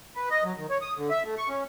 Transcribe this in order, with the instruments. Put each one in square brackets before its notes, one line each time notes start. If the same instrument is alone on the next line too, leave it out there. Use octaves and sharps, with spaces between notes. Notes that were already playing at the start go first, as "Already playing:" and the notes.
[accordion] B4
D#5
F#3
D#3
C#5
D#6
D3
E5
A3
C#6
C#4